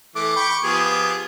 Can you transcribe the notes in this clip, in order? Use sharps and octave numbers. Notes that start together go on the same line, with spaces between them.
E3 A3 D6
G5 B5 C#6
F3 B3 G4 G#4